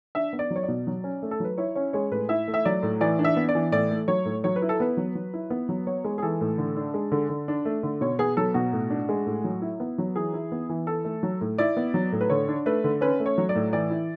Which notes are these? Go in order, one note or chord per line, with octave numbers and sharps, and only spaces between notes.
D4 E5
B3
D5
F#3
C#5
D5
B2
F#3
C#4
A3
A4
F#3 B4
E4 C#5
C#4 C#5
G#3 C#5
A2 B4
E4 E5
A3
E5
F#3 D5
A2
E3 D5
D4
E5
B3
D5
E3
A2 D5
A3
F#3 C#5
A2
F#3 C#5
B4
E4
A4
B3 B4
F#3
F#3
E4
B3
F#3
B3 C#5
G#3
G#4
E3 A4
A2
D3
D4
G#3
D3
D3
D4
A3
D3
B2 C#5
B3 G#4
F#3 A4
B2 F#4
A2
D4
G#3
A2
F#3
E4
B3
F#3
E3 G#4
E4
B3
E3
E4 A4
A3
F#3
A2
E4 D5
B3
F#3
A2
B4
D3 C#5
D4
A3 B4
D3
C#4 B4
A3
C#5
F#3
D5
A2
E3 D5
E4